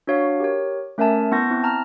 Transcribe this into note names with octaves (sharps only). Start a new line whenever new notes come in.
D4 F#4 C#5 F5
G4 A#4 C#5
A3 C#4 A#4 E5 G#5 A5
B3 E4 A5 C#6 G6 A#6
C4 E4
A5 A#5 F6